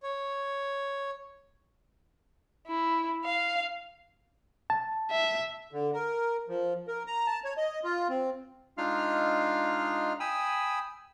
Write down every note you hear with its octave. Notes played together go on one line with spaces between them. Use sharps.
C#5
E4
F5
A5
E5
D3
A#4
F3
A#4
A#5
A5
C#5
D#5
F4
C4
G#3 D4 D#4 F4 F5 F6
G5 G#5 B5 D#6 E6